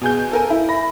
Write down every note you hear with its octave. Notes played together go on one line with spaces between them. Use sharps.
B2 G#4 G6
A4 A#4 G#5
E4
B5 A#6